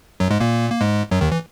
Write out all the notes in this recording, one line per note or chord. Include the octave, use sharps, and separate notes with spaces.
F#2 F#3
G#2 G#3
A#2 A#3
A#3
G#2 G#3
F#2 F#3
D#2 D#3
E3